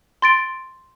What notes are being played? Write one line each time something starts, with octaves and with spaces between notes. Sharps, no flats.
C6 A6 D7